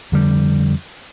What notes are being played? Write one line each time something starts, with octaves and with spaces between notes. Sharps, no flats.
F2 D3 G3